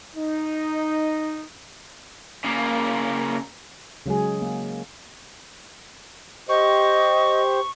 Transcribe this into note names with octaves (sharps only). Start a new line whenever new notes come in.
D#4
C#3 A#3
C#3 F#3 G#3 G#4
A#3
G4 C5 D#5 C#6